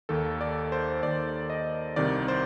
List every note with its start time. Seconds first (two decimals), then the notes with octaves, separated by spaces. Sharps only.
0.09 D#2 D#3 A4
0.41 D5
0.72 C5
1.03 D#2 D#3 D5
1.50 D#5
1.96 C2 C3 D#3 D5
2.28 C5